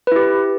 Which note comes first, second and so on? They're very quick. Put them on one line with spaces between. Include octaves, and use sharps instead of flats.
B4 E4 G4